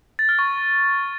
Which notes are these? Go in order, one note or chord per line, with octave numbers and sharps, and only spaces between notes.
A6
F6
C#6